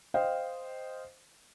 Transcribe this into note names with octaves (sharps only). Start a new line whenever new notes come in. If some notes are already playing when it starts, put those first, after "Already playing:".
C5 D#5 F5 G5